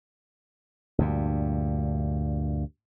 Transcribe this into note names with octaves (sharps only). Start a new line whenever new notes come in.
D2 G2 A#2